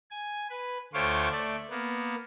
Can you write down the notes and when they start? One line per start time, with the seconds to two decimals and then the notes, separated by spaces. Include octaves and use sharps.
0.11 G#5
0.50 B4
0.94 D2 A3 F4 C5 C#5 D6
1.31 A3 D5
1.70 A#3 B3